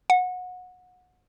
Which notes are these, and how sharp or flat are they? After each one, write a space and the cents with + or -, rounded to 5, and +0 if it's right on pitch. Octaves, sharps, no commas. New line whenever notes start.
F#5 -25